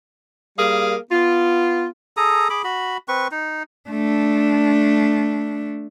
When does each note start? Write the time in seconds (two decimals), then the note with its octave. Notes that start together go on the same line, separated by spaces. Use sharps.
0.59 G3 A#3 G#4 A#4 F5
1.12 B3 F4
2.17 G#4 A4 A#5 D#6
2.50 G#4 B5 D6
2.64 F#4 B5
3.08 C4 B4 C#6
3.31 D#4
3.89 A3 D4